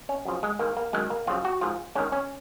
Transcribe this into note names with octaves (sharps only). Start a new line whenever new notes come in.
C#4
F#2 C#3 F3
G#3
G#2 D#3 A#3
A#3
F#2 D#3 G#3
A#3
F#2 C#3 F3 F4
F#4
G#2 F3 F4
G#2 D#3 C#4
C#4